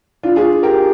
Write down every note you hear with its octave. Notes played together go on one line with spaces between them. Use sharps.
D4 F4
F4 G#4
G4 A#4